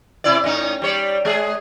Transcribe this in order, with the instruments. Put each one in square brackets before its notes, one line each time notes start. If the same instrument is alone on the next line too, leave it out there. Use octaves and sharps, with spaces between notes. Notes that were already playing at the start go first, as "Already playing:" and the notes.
[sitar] C3 E4 D5
A2 C#4 D#4
G3 C#5 D5
G#3 G#4